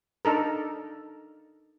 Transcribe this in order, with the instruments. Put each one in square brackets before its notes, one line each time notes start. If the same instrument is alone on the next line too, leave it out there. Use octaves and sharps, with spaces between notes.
[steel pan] D4 D#4 A4 A#4